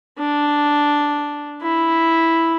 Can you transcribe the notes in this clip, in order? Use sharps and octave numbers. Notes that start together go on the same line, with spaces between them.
D4
E4